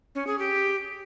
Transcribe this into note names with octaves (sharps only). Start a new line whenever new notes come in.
C#4
G#4
G4